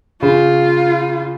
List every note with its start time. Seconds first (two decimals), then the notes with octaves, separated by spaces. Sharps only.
0.22 C#3 F4